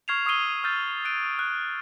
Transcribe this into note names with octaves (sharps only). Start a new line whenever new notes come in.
C#6 F6 G#6 C7 E7 F7
C#6 D#6 E6 C7 D#7 G7
E6 F6 G6 A6
F#6 D7 D#7
F#6